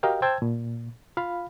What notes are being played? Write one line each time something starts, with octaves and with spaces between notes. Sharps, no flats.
F#4 G4 A#4 D#5 F5 G5
C5 G5 A5 E6 G#6
A#2
F4 F5 B5